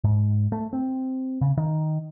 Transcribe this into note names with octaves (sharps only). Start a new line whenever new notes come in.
G#2
A3
C4
C#3
D#3